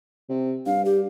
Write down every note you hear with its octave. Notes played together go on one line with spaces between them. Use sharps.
C3
G2 F5
G4